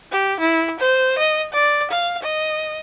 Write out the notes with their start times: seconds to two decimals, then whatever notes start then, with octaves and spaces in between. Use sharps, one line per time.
0.11 G4
0.40 E4
0.80 C5
1.18 D#5
1.52 D5
1.91 F5
2.22 D#5